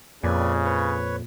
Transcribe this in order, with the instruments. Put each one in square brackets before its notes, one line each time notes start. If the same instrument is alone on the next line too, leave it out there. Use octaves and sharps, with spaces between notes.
[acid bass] F2 [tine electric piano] A#2 [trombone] C#3 [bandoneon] B4 D5 G#5
[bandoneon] B4 C#5